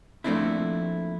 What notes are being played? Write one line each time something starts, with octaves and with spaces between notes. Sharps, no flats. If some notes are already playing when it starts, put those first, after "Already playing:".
F3 A3 A#3 C4 D4 E4